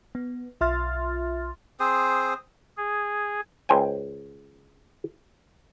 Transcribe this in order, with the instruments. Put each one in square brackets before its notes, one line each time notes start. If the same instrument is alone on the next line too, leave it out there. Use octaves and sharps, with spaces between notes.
[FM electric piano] B3
B1 F4 E5 C6 F6 A6
[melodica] C4 G#4 C5 D#6
[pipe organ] G#4
[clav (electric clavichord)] C#2 C5 G5 G#5